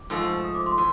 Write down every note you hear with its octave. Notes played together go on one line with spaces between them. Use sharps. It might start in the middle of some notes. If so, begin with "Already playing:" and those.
Already playing: D6
G#2 F3 A3
D#6
D6
C6
E3